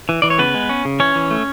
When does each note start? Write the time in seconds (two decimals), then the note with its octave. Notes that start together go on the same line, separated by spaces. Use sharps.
0.09 E3
0.22 E3 D5
0.30 C#5
0.38 C#3 B3 B4
0.54 G#3
0.69 C#4
0.85 C#3
1.00 E3 C#4 C#5
1.15 E3
1.31 A3